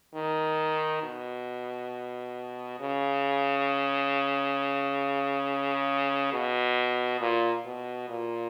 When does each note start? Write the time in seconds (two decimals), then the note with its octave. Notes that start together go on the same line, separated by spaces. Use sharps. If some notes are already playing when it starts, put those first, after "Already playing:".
0.14 D#3
1.02 B2
2.80 C#3
6.32 B2
7.21 A#2
7.65 B2
8.09 A#2